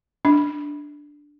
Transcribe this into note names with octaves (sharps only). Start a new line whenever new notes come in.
D4